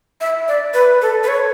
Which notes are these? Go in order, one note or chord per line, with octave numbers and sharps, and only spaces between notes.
E5
D5
B4
A4
B4
C#5